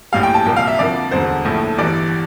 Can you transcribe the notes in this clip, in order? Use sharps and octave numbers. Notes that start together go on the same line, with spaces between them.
A#1 A2 G3 F5
G5
A5
C2 A#2 F3 A#3 G5
F5
E5
F2 D3 F3 A#3 D5
E1 D2 D3 C5
A#1 A2 F3 A3
G1 G2 E3 D5